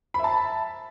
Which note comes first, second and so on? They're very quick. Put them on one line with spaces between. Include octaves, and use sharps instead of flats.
B5 E5 A5